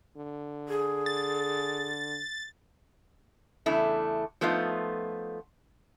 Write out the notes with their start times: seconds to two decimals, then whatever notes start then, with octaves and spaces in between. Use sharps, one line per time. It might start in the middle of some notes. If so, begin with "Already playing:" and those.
0.16 D3
0.68 G#4
1.06 A6
3.66 E2 C#3 A3 D4 E4
4.41 F3 A3 B3 D#4 F4